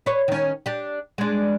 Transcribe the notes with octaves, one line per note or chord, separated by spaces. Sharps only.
B4 C#5
D#3 C#4
D4 G4
G#3 D4